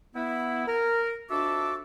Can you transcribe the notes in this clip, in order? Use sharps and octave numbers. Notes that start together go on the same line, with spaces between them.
B3 E4
A#4
F2 D4 F#4 A4 E5 D6